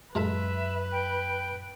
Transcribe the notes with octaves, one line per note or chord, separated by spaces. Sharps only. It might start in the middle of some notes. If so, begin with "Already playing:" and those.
F#2 G#3 F4 A4 B4 E5
G5